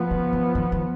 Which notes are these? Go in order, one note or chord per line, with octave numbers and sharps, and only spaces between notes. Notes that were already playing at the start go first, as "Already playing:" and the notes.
Already playing: F3 B3
C#3
D#3
D#3
D#3